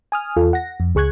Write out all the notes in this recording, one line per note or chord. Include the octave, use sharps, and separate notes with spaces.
G#5 D#6 F6
E2 F4 A4
F#5 A#6
F2
C#2 G#4 C#6 F#6 G#6